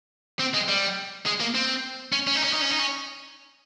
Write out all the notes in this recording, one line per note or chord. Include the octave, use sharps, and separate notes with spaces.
C4
G#3
G3
G#3
A#3
C4
C#4
C#4
D#4
C#4
D#4
C#4
D#4
C#4